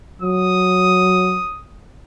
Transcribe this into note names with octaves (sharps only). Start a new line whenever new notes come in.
F#3 D#6